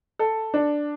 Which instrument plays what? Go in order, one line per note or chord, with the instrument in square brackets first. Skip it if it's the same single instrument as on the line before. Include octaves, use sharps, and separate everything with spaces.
[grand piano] A4
D4